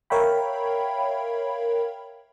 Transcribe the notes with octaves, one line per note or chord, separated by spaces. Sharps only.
A#4 C#5 E5 F5 G5 B5